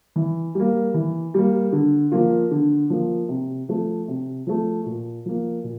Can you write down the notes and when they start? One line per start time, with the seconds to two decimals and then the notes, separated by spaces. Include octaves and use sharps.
0.16 E3
0.55 G3 A#3
0.94 E3
1.34 G3 A#3
1.73 D3
2.12 F3 A#3 F4
2.51 D3
2.90 F3 A#3 F4
3.29 C3
3.69 F3 A3
4.08 C3
4.47 F3 A3
4.86 A#2
5.26 F3 A#3
5.64 A#2